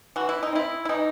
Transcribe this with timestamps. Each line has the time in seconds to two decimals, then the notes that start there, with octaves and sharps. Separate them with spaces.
0.16 E3 F#4
0.29 E4
0.43 D#4
0.52 C4 E4
0.85 E4
0.89 E3 D#4